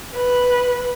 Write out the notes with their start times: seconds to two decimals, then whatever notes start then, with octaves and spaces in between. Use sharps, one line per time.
0.14 B4